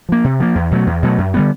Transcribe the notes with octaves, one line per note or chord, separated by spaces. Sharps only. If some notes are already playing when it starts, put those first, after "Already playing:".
F3 A#3
C3
F3 A#3
E2
B2 F#3 A3
E2
B2 F#3 A3
F#2
D3 G3 B3